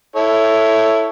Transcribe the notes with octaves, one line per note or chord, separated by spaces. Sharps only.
E4 A4 C#5